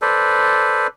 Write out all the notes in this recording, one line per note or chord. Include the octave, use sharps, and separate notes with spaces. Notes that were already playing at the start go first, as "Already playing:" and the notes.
A4 B4 C5 D5